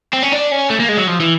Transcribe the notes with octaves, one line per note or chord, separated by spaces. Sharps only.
C4
C#4
D4
C#4
A3
A#3
G#3
F#3
F3
E3